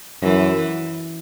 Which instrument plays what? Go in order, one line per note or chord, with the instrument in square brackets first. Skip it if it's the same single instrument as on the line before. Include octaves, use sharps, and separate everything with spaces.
[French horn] F#2 [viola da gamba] E3